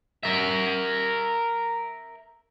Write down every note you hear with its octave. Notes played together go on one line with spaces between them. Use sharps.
A#4 E5